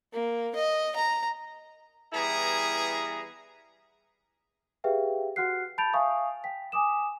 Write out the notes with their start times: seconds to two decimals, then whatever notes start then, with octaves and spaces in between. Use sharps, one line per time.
0.13 A#3
0.55 D#5
0.96 A#5
2.13 E3 G3 B3 E4 G#4 A#5
4.84 G4 G#4 B4 E5 F5 G5
5.36 F#4 F#5 F6 F#6 C7
5.78 A5 B5 G6 A6 D7 F7
5.93 E5 F5 G#5 C#6 D#6
6.44 G5 B6
6.72 G#5 D6 D#6 E7